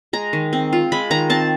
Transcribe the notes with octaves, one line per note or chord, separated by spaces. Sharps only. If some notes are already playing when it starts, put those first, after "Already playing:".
G#3 A#5
D#3
C4
F4
G#3 B5
D#3 A#5
C4 A5